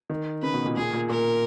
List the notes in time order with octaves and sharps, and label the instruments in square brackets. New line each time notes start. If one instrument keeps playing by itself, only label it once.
[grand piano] D#3
[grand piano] C#3 [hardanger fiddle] B4
[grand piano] B2
A#2
[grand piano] A#2 [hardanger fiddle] G#4
[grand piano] A#2
[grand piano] A#2 [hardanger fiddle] A#4